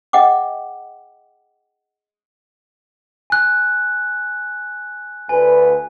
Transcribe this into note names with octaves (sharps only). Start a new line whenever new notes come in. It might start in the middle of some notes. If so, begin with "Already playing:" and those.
G#4 D#5 F#5 G5 D6
G#5 F#6
D2 B4 G#5